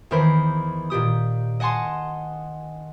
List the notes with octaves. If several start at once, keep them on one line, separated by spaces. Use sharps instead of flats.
E2 D#3 E3 A#4 C5 B5
A#2 D#3 G4 D#6
D#5 F#5 G#5 A5 C6